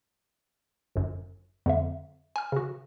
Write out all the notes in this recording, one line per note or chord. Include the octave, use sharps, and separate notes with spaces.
G1 F#2
F2 D3 E5
G#5 F6
C#3 F#4